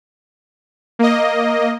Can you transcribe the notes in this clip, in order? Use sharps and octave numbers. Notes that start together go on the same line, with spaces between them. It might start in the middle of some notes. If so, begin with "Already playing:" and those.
A#3 D#5